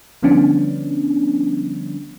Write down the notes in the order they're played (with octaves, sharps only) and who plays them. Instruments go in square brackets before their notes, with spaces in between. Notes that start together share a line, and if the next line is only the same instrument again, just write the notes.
[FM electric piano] D3 F3 G3 B3 C#4 D4